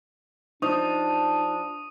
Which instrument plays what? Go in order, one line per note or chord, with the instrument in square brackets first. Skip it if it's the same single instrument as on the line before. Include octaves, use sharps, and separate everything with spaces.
[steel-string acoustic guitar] F3 [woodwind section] D4 [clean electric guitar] D#4 [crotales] C#6 D#6